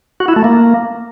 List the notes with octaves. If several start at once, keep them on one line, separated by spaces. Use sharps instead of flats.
F#4
E4
A3
A#3